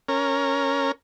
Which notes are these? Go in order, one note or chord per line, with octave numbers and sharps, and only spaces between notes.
C#4 A#4